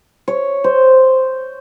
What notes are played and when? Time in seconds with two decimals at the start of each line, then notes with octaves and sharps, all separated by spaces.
0.28 C#5
0.64 C5